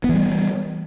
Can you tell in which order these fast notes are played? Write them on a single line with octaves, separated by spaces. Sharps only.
B3 E3 G3